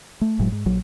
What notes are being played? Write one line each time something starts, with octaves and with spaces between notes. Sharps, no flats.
A3
F#1 A2 F#3 G#3
G#2
A#1 F#3